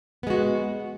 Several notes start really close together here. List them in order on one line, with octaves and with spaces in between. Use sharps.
B3 G#3 F#4